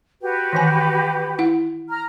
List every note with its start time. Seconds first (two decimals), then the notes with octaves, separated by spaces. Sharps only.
0.22 F#4 G4 B4
0.53 D#3 E3 G#5
1.39 E4 F#5
1.90 A#5 F6